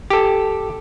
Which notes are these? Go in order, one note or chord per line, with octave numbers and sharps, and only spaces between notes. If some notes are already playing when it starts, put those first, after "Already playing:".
G4 A4